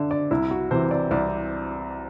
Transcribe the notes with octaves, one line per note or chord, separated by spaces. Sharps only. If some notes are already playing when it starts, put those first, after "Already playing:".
Already playing: D3 E5
D5
C2 E4
F#4
C3 E3 C5
D5
C2 D5